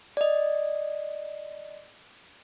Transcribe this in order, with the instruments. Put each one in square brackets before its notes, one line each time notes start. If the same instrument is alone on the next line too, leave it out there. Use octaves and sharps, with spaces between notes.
[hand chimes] D5 D#5